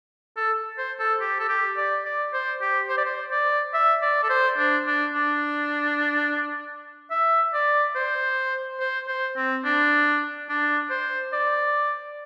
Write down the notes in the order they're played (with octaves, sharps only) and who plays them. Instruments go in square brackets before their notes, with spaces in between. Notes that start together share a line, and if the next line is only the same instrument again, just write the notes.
[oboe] A4
C5
A4
G4
A4
G4
D5
D5
C5
G4
C5
D5
C5
D5
E5
D5
A4
C5
D4
D4
D4
E5
D5
C5
C5
C5
C4
D4
D4
C5
D5